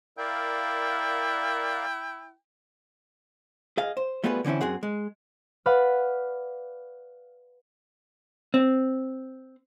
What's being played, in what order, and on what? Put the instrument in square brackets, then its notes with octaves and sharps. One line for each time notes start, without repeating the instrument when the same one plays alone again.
[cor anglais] E4 [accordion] A#4 D5 F5 [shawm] G5
[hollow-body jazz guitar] G#4 D#5 F5
C5
G3 A3 B3 F4 G#4 B4
D3 E3 C4 C#4 E4
F#2 C4 G#4 F#5
G#3
[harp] B4 D5 F5 F#5 B5
[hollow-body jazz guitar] C4